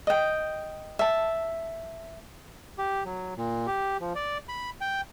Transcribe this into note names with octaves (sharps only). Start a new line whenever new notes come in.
D#5 G5
E5 A5
G4
F#3
A#2
G4
F3
D5
B5
G5